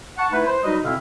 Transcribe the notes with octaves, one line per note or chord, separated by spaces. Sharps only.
F#5 A5 C#6
A3 D#4 E4 B4
C5
F#3 G3 D#4 F#4 B4 D#5
B2 D3 C4 E4 E5 F5